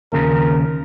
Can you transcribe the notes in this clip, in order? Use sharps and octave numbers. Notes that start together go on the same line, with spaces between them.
D#2 C#3 F3 A#4